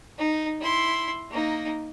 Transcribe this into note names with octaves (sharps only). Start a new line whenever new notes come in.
D#4
E4 C6
A#3 D#4